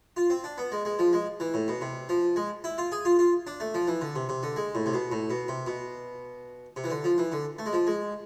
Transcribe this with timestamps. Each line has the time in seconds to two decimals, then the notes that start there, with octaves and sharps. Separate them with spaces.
0.17 F4
0.30 C4
0.44 D4
0.58 B3
0.72 G#3
0.85 G#3
0.99 F3
1.13 G#3
1.40 E3
1.54 A2
1.68 B2
1.82 C3
2.09 F3
2.36 G#3
2.64 E4
2.78 F4
2.92 G#4
3.05 F4
3.19 F4
3.47 D4
3.60 A3
3.74 F3
3.88 E3
4.01 D3
4.15 C3
4.29 C3
4.43 D3
4.56 G#3
4.75 A2
4.86 C3
4.94 B2
5.12 A2
5.30 B2
5.48 C3
5.66 B2
6.76 C3
6.84 E3
6.90 D3
7.04 F3
7.18 E3
7.32 D3
7.59 A3
7.66 G#3
7.73 F3
7.87 G#3